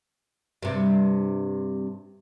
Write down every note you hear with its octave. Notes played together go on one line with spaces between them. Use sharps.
G2 C3